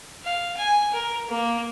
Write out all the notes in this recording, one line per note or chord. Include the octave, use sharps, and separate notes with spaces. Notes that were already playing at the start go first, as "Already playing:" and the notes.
F5
G#5
A#4
A#3